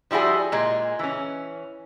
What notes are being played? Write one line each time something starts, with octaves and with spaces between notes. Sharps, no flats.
F3 G3 E4 F#4 G#4
A#2 G#3
E3 C#4